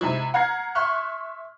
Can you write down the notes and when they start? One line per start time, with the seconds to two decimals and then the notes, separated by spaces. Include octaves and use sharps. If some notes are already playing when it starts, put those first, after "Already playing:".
0.01 C3 G#3 E4
0.34 F#5 A#5 F6 G#6 C7
0.75 E5 C6 C#6 F6 F#6